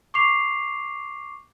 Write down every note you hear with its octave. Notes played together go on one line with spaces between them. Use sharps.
C#6 D6 C7 F7